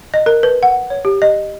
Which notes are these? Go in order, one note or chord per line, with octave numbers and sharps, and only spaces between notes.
D#5
A#4
B4
F#5
C#5
G4
D#5